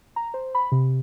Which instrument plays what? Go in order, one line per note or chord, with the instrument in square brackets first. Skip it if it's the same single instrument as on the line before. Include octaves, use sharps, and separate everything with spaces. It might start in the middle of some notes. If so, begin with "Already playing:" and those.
[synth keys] A#5
C5
B5
C3